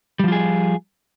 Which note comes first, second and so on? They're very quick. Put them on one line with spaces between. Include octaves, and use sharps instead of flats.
G3 F3 F4 G#4